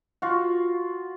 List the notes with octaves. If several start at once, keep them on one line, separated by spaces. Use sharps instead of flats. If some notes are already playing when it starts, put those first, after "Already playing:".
F4 F#4